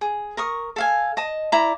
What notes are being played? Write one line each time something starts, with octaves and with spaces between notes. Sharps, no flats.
G#4
A#4 C#6 D#6
A4 F5 G#5
D#5 A5
E4 D5 A#5